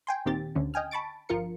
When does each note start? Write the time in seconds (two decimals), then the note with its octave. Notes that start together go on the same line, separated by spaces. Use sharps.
0.07 G5 G#5 C6
0.26 D#2 A#2 D#3 C4 G4 A6
0.55 D2 D3 C#4
0.74 D#5 G5 G#5 F6
0.91 A5 B5 C#6 A6 D7
1.29 G1 F3 F4 A#4 C#7